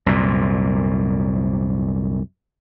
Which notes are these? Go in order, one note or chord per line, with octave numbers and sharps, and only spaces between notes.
C2 F#2 A#2